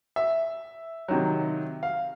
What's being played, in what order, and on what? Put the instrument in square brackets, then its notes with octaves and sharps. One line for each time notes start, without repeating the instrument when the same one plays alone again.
[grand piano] E5
C3 D#3 F#3
F5